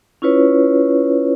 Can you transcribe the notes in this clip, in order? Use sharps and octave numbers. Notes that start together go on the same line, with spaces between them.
C#4 E4 F4 B4 C#5